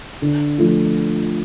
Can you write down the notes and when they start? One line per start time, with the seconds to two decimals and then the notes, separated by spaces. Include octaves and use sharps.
0.22 D3
0.58 F3 A3 F4